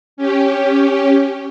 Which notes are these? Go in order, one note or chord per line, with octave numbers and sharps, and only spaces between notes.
C#4 G4